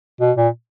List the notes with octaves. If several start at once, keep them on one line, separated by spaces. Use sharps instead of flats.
B2
A#2